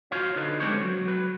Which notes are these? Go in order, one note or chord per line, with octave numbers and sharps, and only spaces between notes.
F4 F#4 C5 C#5 F5
D3 D#4 B4
G3 G#3 C4 D4 C5 C#5
F#3
F#3 B4